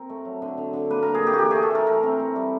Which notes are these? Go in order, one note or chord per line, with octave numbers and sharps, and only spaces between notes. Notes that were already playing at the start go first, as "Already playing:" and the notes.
Already playing: C4 A#4
A3
F#3
D3
D3
D3
A#3 B4
D3 A#4
G#4
A#3 G4
F#4
E3 G4
A3 G#4
A4
E3 A#4
A3 A#4
C4
A3
G3